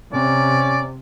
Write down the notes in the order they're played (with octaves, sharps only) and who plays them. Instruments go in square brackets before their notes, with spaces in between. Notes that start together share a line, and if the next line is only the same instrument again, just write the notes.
[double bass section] C3 [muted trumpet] C#4 [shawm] D5